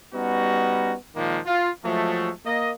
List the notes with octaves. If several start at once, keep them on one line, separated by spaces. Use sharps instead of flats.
G3 B3 C#4 D#4 F#4
A#2 D#3 F3 G#3 A#3
F4
F3 F#3 G#3 A3
A#3 D#5